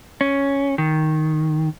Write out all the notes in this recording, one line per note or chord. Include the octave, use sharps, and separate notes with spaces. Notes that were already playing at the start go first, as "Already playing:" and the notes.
C#4
D#3